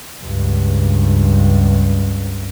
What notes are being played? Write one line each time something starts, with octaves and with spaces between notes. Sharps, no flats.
C#2 G2